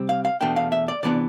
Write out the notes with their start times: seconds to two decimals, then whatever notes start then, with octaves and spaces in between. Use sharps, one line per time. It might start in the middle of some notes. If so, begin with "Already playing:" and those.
Already playing: C3 G3 C4
0.09 F5
0.25 F5
0.41 E2 B2 A3 D4 G5
0.56 F5
0.72 E5
0.88 D5
1.03 C3 E3 B3 D4 D5